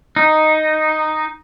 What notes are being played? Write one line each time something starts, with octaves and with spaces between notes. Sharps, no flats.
D#4